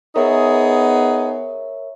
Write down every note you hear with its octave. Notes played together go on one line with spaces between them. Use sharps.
B3 D#4 G#4 A#4 C#5 E5